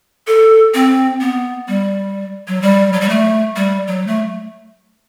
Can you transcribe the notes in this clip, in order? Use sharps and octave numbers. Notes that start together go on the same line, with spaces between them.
A4
C4
B3
G3
F#3
G3
F#3
G3
A3
G3
F#3
A3